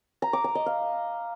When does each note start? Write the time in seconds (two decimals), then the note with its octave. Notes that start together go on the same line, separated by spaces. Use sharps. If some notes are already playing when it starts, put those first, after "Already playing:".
0.22 A#5
0.33 D6
0.44 A#5
0.55 D#5
0.66 F5